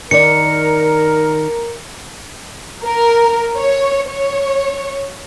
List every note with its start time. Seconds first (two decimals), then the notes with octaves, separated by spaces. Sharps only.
0.11 D#3 D#4 A#4 D5 C#7
2.86 A#4
3.56 C#5
4.09 C#5